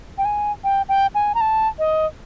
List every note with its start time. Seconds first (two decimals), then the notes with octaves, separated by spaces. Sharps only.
0.18 G5
0.25 G#5
0.64 G5
0.89 G5
1.15 G#5
1.35 A#5
1.41 A5
1.79 D#5